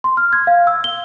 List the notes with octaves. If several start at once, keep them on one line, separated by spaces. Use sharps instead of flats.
C6
F6
G#6
F5
E6
G7